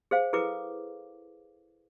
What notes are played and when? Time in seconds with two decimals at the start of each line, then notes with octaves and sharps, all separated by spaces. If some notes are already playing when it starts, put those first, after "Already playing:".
0.11 G#4 C5 F5
0.33 E4 G#4 A4 B4 D6